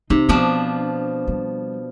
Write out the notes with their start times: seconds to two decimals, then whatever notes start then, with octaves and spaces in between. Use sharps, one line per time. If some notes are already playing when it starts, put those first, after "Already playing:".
0.10 C3 D#4
0.29 B2 F3 B3 D4
1.27 G3